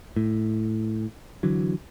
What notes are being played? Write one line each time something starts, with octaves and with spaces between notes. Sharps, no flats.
A2
D3 E3 F#3